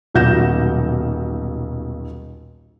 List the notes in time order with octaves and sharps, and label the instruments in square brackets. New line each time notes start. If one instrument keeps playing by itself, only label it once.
[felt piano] D#1 B1 F#5 G6 A#6 E7